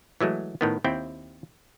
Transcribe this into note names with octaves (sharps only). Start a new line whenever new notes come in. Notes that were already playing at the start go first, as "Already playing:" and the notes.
E3 F#3 G#3 A3
A2 D#3 B3
D#2 C4 E4 G5